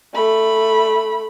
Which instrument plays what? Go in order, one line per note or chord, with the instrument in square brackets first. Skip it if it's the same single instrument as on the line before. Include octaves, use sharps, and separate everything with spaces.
[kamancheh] A3 B5